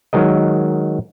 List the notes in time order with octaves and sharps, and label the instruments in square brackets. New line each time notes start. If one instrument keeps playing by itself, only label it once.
[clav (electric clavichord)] D#3 F#3 G#3 A#4 D#5